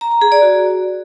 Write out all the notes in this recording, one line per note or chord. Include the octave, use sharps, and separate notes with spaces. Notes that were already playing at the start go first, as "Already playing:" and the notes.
A#5
A#5
G#4
D5
F#4